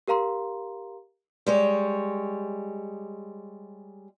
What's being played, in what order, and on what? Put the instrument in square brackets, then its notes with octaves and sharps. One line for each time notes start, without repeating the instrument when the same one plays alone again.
[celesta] G4 A#4 F5 A#5 C6
[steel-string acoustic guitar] G3 G#3 C#5